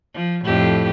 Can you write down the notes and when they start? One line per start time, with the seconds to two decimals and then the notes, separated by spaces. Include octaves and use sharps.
0.15 F3
0.45 F2 A2 G4